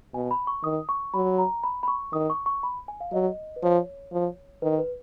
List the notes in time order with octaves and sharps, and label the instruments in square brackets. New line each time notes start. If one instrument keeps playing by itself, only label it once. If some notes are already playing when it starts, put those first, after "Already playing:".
[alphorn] B2 [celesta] G#5
[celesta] B5
C#6
[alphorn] D#3 [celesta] D#6
[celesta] C#6
[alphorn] F#3 [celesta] B5
[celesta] A#5
B5
B5
C#6
[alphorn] D#3 [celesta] D#6
[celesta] C#6
C#6
B5
G#5
F5
[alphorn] F#3 [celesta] D#5
[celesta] B4
[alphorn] F3 [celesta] C#5
[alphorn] F3
[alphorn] D#3 [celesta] B4
[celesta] B4